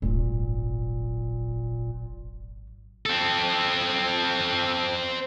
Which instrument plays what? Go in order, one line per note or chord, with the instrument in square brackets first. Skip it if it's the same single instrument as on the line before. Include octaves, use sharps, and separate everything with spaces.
[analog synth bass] D#1 [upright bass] G#1 F#3 [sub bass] A#2
[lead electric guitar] C4 A4